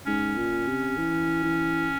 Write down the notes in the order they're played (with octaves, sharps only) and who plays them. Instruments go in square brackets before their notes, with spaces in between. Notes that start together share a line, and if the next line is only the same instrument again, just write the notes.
[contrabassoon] G#2 [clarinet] C#4
[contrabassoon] A#2
C3
E3
E3